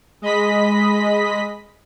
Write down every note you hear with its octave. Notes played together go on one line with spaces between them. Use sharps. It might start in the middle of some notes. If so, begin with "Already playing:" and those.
G#3 D#5 B5 B6